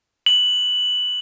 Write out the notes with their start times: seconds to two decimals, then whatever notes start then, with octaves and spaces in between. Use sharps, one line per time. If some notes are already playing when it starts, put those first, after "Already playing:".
0.26 F#7